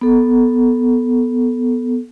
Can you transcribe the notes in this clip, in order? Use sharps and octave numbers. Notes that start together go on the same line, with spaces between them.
B3 A4